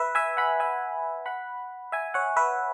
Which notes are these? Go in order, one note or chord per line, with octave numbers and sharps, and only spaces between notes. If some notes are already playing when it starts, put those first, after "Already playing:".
Already playing: B4 E5
E5 G#5
F#5 B5
E5 G#5
F#5 B5
E5 G#5
C#5 F#5
B4 E5